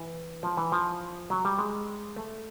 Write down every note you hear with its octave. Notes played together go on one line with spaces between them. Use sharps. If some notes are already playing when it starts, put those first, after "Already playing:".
Already playing: E3
F3
E3
F3
F#3
G3
G#3
A3